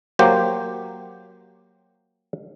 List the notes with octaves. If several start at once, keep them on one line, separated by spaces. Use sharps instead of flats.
F#3 A#3 G4 C5